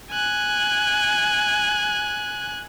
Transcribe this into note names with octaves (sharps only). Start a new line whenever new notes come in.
G#5 F#6